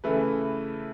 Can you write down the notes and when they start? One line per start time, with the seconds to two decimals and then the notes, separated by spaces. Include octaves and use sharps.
0.04 C#3 E3 A3 E4 B4